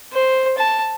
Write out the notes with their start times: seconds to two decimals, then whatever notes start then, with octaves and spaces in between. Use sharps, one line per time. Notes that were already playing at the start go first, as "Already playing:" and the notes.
0.12 C5
0.58 A5